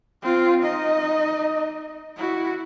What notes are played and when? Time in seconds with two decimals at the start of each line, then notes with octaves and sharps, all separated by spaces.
0.22 C4 F4
0.62 D#4 D#5
2.17 E4 F#4